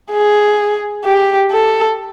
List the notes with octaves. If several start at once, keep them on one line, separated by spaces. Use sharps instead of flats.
G#4
G4
A4